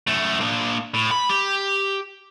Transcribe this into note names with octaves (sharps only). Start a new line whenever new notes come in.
F#2 A3
A#3 D4
A2
B5
G4